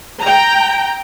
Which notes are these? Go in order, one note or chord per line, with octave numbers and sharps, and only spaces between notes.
G5 A#5